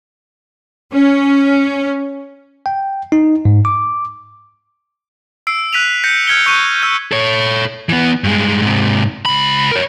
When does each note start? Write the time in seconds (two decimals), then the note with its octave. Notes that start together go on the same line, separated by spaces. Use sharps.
0.92 C#4
2.66 G5
3.12 D#4
3.45 G#2
3.65 D6
5.47 E6 C7 D7
5.73 F#6 B6 D#7 F7
6.04 G6 A#6 C#7
6.27 F6 G6 G#6 B6 C#7 G7
6.46 C#6 F#6 G6 D#7
6.82 E6 G6
7.12 A4 C#5
7.89 E3 B3
8.24 G2 G#3
8.62 G#2 C3
9.26 C#2 B5
9.72 A#4 C#5